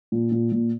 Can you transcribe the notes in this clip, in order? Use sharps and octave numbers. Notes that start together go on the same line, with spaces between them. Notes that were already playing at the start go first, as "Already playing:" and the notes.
A#2
A#2
A#2